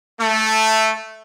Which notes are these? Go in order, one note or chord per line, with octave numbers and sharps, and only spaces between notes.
A3